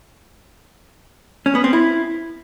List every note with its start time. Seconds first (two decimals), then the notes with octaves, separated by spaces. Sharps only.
1.46 C#4
1.55 B3
1.64 C4
1.73 E4